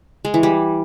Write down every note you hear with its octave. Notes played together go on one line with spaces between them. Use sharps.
G#3
E3
G3